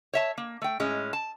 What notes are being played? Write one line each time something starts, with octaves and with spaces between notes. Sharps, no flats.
C#5 E5 A5
A#3
A3 G5
A2 G#3 C#4
A5